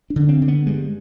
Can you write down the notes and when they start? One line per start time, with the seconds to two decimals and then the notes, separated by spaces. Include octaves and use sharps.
0.10 D4
0.16 D3
0.29 C4
0.42 D3
0.48 B3
0.66 G2 G#3